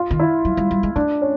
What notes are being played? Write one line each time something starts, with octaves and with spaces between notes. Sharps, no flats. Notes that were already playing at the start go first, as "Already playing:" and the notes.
Already playing: F4
D#3
E4
F#3
G3
G3
G#3
A3 D4
C#4